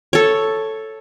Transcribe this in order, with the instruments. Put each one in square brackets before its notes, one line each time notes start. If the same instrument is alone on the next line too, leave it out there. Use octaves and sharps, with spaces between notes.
[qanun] A4 C#5